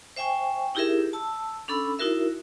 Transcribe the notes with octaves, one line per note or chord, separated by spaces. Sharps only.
C5 E5 G5 G#5 C#6
D#4 E4 G4 G#4 A#4 E5
A5 E6
C#4 D4 A4 B5 E6
D#4 E4 F#4 A#4 E5